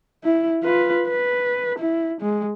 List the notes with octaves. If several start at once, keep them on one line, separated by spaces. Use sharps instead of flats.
E4
F4 B4
B4
E4
G#3